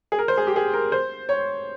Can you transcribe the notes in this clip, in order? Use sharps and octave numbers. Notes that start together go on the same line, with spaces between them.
G#4
A#4
C5
G#4
G4
G#4
A#4
C5
C#5